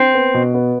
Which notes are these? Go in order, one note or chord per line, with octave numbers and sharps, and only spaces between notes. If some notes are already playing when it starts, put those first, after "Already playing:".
Already playing: C4
B3
B2
B3